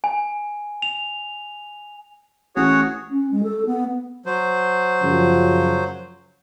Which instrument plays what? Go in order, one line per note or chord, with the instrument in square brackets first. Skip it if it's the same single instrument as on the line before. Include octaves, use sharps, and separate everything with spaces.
[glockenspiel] G#5
F7
[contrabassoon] A1 [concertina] F#4 G#4 C#5
[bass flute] C#4
G#3
A4
B3
[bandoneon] F#3 C5
[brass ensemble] F#2 C#3 F3